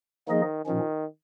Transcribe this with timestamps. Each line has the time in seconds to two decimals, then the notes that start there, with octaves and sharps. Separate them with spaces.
0.28 D#3 F3 A#3 D#4 G#4 D#5
0.66 A#2 D#3 F3 C#4